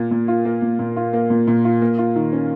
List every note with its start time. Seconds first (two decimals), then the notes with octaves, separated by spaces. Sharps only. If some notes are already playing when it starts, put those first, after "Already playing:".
Already playing: A#2 A#3
0.11 A#2
0.28 F4
0.45 A#3
0.62 A#2
0.79 A#2
0.96 F4
1.13 A#3
1.30 A#2
1.47 A#2
1.64 F4
1.82 A#3
1.98 F4
2.16 D#3
2.32 C#4